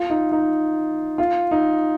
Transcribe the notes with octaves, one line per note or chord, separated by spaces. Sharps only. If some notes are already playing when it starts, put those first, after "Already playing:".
Already playing: F4
D#4
D#4
F4
D#4